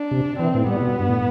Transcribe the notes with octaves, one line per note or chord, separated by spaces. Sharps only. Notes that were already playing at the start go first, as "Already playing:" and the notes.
Already playing: D4
C3
E3 C4
A2
G3 B3
B2
G2
A2